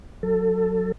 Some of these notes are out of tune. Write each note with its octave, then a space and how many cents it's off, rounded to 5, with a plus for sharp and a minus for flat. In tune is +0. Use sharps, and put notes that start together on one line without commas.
F#3 -10 A4 +20